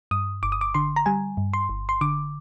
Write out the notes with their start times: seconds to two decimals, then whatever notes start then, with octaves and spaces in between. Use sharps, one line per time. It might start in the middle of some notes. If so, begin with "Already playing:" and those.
0.11 G2 D#6
0.43 G1 D6
0.52 D#6
0.61 D6
0.74 D3 C6
0.96 A#5
1.06 G3 G#5
1.37 G2
1.54 C6
1.69 G1
1.89 C6
2.01 D3 D6